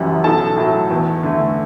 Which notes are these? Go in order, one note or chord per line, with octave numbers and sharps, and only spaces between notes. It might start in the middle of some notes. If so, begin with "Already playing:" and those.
Already playing: F#1 F#2 E3 G3 F#5
B1 A4 A5
A2 F#3
E2
D3 A3